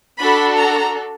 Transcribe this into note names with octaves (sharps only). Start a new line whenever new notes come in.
D4 F#4 A4 B5
A#5